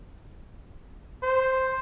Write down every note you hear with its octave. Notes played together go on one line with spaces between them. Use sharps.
C5